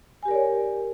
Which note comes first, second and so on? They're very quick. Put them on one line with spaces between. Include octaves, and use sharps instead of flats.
G#5 G4 A#4 D5 C#5